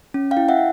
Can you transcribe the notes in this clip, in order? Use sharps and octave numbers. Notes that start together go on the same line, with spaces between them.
C#4
F5 G5
E4
E5 F#5